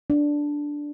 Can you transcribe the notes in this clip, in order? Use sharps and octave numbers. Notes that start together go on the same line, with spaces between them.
D4